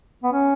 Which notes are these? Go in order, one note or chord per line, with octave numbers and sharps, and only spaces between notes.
B3
C#4